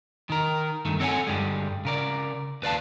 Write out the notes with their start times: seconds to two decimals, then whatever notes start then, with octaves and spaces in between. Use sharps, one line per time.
0.30 D#3 A#4
0.85 G2 D#3 A3
1.00 C4 A4 C#5 E5 F#5 G#5
1.27 G2 A#2 D3 G3 G#3
1.85 C#3 A#4 D5
2.62 D#2 B4 D5 F5 A5